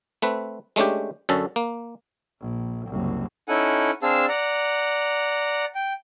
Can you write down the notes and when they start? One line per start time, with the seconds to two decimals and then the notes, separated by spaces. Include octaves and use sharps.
0.22 A3 C4 B4
0.76 G#3 A3 C#4 D4 G4
1.29 F#2 D3 C#4 A4
1.56 A#3
2.41 A#1
2.88 F#1 C2
3.48 C#4 D#4 E4 A4 F#5 G#5
4.03 C4 D4 G#4 F5 A5 E6
4.29 D5 F#5 A#5
5.75 G5